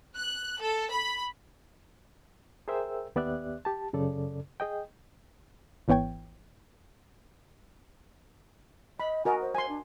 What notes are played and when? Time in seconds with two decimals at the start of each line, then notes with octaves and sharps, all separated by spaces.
0.15 F#6
0.60 A4
0.92 B5
2.68 G#4 A#4 C5 E5 G5 E6
3.16 D#2 B3 G4 D5 E5 F#6
3.65 G4 A5
3.93 F#2 C#3 A4 D5
4.60 G#4 D#5 G5
5.88 G#1 E3 B3 C#5 G5 G#6
9.00 D#5 B5
9.25 F#4 A#4 D#5 G#5
9.41 C5
9.55 G#5 C6
9.69 D4